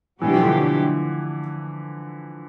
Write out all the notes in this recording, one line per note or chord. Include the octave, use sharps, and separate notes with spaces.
B2 E3 F#3 A3 D4 G4
F3
D3 E3